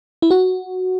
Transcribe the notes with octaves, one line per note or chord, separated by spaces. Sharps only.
E4
F#4